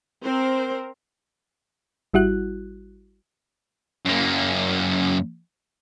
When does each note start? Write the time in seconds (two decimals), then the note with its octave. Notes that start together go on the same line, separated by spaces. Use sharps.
0.24 C4 A#4 C5
2.14 G#1 G3 E4 F#4 F#6
4.05 F#2 A#3